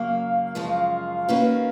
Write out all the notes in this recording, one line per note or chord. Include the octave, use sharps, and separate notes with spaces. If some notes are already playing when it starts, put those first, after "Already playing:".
Already playing: F#2 C#3 F#3 A#3 F5
F#2 C#3 F3 G#3
D#3 A#3 C#4 F#4 B4